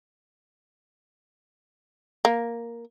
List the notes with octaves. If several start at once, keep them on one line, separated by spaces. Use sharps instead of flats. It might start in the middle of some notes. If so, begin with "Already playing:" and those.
A#3